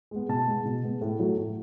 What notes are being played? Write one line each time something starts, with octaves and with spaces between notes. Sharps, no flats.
G#3 B3
B2 A5
G#3 B3
B2
G#3 B3
A2
F#3 A3
A2